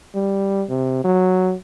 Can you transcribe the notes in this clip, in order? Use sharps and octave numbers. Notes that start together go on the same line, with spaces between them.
G3
C3
F#3